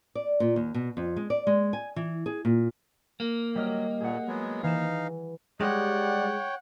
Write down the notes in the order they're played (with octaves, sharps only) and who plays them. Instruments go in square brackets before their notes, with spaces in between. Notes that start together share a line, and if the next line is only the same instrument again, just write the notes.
[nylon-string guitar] D5
A#2
D#2
B2
F2
G#3
D5
G#3
G#5
E3
G#4
A#2
[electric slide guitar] A#3
[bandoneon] F#3 [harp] G3 D#5 F6
[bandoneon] A#2 [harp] G#4 F#5
[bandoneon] F#3 G#3 B3
[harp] E3 E7 [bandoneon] D#4 F5
[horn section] G3 D5 [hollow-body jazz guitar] G#3 [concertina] C#5 G5 [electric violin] F#5